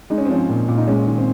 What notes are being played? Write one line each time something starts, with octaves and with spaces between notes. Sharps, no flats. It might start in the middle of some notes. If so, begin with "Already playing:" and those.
G#3 D#4
C#4
C4
F3 C#4
A#2
A#2
D#4
G#3 C#4
D#3
C4